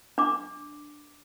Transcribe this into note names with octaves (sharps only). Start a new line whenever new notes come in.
D4 D6